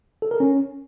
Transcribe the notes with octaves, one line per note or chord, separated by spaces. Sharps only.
A4
A#4
C#4